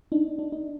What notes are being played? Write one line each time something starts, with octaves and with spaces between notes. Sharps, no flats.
D4 D#4
D4
D#4